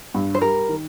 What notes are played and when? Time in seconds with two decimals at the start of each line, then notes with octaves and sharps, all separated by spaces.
0.14 G2
0.35 C5
0.41 G3 A#4
0.69 D#3